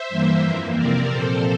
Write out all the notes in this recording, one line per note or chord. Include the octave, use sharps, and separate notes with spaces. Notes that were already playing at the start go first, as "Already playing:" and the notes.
Already playing: C5 E5
G2 E3 A#3
F2 E3 A#3
C3 F3 C4 A#4 D5
A#2 F3 C4 A4 C5